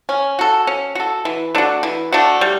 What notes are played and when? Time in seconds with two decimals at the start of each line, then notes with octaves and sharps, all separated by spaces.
0.09 C#4
0.39 F#4 A4
0.67 C#4
0.95 F#4 A4
1.25 E3
1.55 A3 D4 F#4
1.83 E3
2.12 A3 D4 F#4
2.41 G3